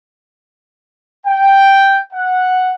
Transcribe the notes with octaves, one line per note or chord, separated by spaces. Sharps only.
G5
F#5